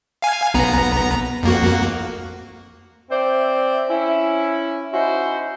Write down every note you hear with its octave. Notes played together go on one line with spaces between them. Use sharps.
F5 G#5
B1 B3 A#5
F2 A#3 F#4
C4 C5 D5 E5
C#4 E4
C#4 D#4 E4 F#4 C5